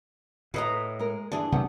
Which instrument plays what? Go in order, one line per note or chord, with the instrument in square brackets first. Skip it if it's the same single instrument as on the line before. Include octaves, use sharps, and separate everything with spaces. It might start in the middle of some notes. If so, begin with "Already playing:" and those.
[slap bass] A2 [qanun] B4 D#5 A#5
[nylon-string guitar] G#3 A#4
[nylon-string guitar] G2 E3 E4 [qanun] D4 G#4
[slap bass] C3 F#3 A3 [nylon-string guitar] B3 G4 F#5